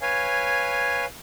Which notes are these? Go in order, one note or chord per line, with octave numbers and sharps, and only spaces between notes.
B4 C#5 F5 G#5